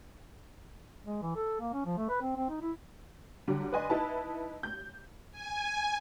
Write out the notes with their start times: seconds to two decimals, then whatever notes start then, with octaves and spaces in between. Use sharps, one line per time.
1.06 G#3
1.23 E3
1.36 A4
1.60 A#3
1.73 C#4
1.86 F3
1.97 A3
2.09 B4
2.22 C4
2.36 C4
2.49 D#4
2.61 E4
3.48 D3 F#3 G3
3.72 B4 D5 D#5 G#5 C6
3.89 D#4 E4 B4 A5 B5
4.63 G6
5.31 G#5